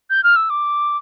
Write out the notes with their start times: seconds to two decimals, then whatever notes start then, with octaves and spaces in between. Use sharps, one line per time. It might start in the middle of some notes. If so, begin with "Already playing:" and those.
0.10 G6
0.24 F6
0.36 E6
0.50 D6